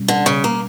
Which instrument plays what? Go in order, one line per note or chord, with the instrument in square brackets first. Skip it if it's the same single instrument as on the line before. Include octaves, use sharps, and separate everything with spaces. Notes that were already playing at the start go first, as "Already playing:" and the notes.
Already playing: [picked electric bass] B2 G3 C#4
[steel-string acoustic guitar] D3
C#3
A#3